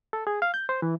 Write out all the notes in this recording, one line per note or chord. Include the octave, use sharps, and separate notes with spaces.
A4
G#4
F5
G6
C5
E3